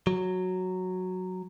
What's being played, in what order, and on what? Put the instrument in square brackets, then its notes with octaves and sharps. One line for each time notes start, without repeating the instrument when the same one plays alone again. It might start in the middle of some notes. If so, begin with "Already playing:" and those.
[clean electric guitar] F#3